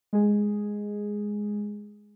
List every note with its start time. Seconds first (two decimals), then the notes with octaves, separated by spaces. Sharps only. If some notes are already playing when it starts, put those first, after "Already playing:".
0.13 G#3 G#4